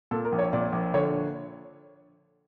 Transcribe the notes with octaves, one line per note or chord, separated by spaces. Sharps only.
A#2 A4
A#4
A#1
C#5
A#2 D5
A#1
D3 C#5